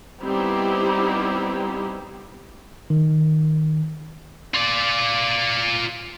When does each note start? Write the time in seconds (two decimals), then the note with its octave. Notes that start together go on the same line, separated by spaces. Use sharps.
0.22 G3 B3 C4 D#4 E4 G4
2.90 D#3
4.54 F4 D5